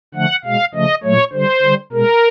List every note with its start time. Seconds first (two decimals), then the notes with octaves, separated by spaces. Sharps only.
0.15 D3 F3 A3 F#5
0.44 B2 G#3 F5
0.75 C#3 F3 A3 D#5
1.04 A#2 F#3 A3 C#5
1.33 D3 G3 C5
1.63 D3 G3
1.92 B2 G#3 A#4